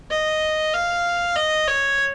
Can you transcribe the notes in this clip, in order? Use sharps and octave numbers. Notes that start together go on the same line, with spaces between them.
D#5
F5
D#5
C#5